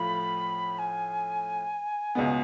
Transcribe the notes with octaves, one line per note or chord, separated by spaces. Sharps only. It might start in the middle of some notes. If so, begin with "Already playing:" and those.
Already playing: A2 F3 A3 F4 B5
G#5
C#2 B2 G#3 B3